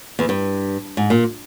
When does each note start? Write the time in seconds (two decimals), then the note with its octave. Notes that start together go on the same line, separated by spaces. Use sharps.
0.19 E2
0.29 G2
0.97 G#2
1.10 A#2